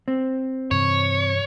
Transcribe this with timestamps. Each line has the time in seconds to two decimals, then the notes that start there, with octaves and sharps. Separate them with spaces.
0.08 C4
0.71 G2 C3 E3 C#5